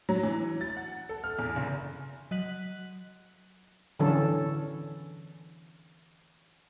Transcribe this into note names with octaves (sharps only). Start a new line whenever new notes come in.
F#3
E3
A6
F#5
A4
F6
E2
F#1
F#3 D#5 F#6 B6 F#7
D3 E3 F#3 C#4 D4 A4